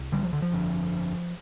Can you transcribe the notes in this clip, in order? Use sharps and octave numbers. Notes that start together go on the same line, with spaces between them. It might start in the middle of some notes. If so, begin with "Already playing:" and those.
Already playing: C2
D3 G3
F3
D3
F3
G1 F2 D3